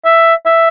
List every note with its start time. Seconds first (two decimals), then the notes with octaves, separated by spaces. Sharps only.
0.05 E5
0.46 E5